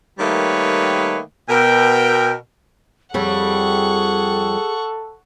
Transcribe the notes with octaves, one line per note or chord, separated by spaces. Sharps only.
D#3 G3 A3 A#3 B4 C#5
B2 A#4 G5
F2 G3 G#4 A4 C#5 F#5 C#6